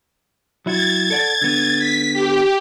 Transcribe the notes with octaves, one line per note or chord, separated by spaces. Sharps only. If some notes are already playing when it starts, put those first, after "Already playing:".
F#3 E4 F#4 G#6 A6
A4 D5 F#5
D3 B3
B6
G4